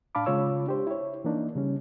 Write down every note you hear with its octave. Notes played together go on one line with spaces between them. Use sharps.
A2 D4 F5 A5 B5 D6
C#3 G#3 F4 C#5 E6
D4 G4 C5
E4 C#5
E3 A#3 D4 D#4
C#3 G3 C#4